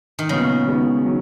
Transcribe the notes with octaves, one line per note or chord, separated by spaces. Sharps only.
D#3
A#2 C#3 F#3 B3 F#4
D#3 G#3 B3 F#4
D#3 F#3